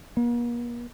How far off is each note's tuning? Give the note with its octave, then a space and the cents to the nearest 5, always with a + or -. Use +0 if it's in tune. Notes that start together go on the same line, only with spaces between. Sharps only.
A#3 +45